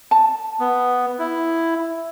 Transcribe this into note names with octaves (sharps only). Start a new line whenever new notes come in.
A5
B3
E4